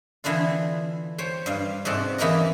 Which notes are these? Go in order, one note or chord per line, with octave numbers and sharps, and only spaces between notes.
D3 E3 B3 D4 F4
C5 C#5 G5
G2 D5 F5
G#2 C3 G#3 F#4 A4 D5
E2 E3 A#3 D#4 A#4 D#5